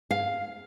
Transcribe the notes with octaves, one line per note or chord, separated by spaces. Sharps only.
F5